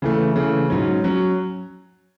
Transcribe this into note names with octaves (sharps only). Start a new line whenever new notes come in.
C#3 E3 A3
C#3 E3 A3
G#2 F#3 C#4
F#3 C#4